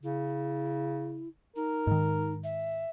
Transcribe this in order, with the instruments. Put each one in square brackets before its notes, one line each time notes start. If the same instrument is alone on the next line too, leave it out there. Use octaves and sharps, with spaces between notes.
[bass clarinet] C#3 [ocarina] E4
[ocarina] D#4 [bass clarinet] A#4
[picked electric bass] G#2 D#3
[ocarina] E5